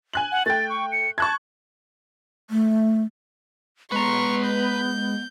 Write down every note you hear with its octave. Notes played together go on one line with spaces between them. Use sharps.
G#5 F#6 F#7
F#5
A3 G5 A6
C#6
C#7
A5 C#6 F#6 G#6
A3
G#3 B3 B4 A#5 C6 C#6
G6